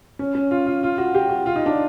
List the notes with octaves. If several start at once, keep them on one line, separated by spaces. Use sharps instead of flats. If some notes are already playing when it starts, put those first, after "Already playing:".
C#4
C#4
F4
F4
F4
F#4
G4
F#4
F4
D#4
D4